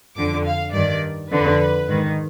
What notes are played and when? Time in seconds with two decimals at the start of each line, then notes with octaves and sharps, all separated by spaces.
0.16 F2 D3 D6
0.45 F5
0.73 G2 D#3 D5
1.31 F2 D3 B4
1.89 G#2 D#3